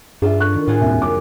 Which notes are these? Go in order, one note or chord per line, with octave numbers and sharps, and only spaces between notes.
G2 D4 F4 G#4 E5
A4 C#6 F#6
D#3
A2 F4 F#4 G#4
D#1 F2 E5
F#1 D6